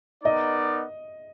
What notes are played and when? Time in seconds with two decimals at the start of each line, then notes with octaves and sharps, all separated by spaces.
0.24 B3 D#4 A#4 D5 D#5